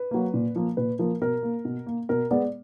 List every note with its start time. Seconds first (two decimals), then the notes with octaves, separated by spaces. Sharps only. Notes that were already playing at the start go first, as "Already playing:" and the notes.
Already playing: B4
0.11 F#3 A#3
0.34 A#2
0.56 F3 A#3
0.77 A#2 B4
0.99 F3 A#3 A#4
1.21 B2 A#4
1.43 A#3
1.65 B2
1.86 A#3
2.09 B2 A#4
2.31 G#3 B3 D5